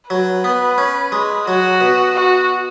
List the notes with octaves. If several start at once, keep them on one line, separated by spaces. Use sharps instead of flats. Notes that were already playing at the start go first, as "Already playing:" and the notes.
F#3 B4
B3
C#4
G#3
F#3 F#4
B2
F#4